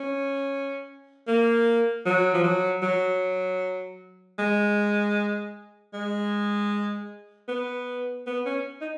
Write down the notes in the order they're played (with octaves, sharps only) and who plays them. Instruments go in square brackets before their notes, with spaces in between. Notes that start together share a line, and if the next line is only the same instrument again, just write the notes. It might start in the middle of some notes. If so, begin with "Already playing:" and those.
Already playing: [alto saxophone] C#4
A#3
F#3
F3
F#3
F#3
G#3
G#3
B3
B3
C#4
D#4